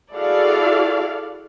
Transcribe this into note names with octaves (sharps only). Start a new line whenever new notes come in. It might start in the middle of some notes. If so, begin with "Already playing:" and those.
E4 F#4 G#4 A4 D5 F5